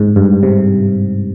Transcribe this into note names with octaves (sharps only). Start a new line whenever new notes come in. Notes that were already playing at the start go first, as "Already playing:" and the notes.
Already playing: G#2
G2
C3